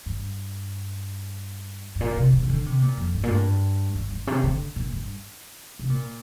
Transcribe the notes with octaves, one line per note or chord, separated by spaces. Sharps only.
G2
G2
A#2
C3
C3
C3
D3
C3
A#2
F2
G2
A#2
G2
G2
G2
C3
D3
A#2
G2
C3
A#2